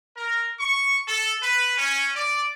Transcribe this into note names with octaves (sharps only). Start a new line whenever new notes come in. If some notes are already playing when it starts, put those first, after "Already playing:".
A#4
C#6
A4
B4
C#4
D5